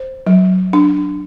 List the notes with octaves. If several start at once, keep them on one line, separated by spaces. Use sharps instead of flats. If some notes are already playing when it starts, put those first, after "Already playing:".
Already playing: C5
F#3
D4